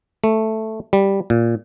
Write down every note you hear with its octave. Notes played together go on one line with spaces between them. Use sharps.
A3
G3
A#2